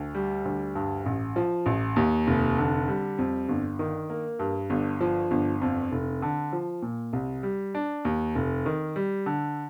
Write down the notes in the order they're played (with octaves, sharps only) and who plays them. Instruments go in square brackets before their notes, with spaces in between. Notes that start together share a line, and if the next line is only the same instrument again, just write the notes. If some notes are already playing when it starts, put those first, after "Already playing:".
Already playing: [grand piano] D2
G3
D2
G2
A1
F3
A1
D#2
F1
D3
G3
F2
G1
D#3
A#3
G2
G1
F3
G1
F2
F1
D3
F3
A#2
C2
G3
D4
D#2
F1
D#3
G3
D3